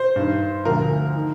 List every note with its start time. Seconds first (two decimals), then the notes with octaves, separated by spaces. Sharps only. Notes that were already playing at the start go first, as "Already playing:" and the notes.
Already playing: C5
0.16 G2 D#3
0.65 D2 D3 F3 A#4
1.16 D#3